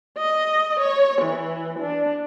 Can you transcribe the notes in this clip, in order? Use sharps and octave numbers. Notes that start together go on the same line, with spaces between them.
D#5
C#5
E3
D4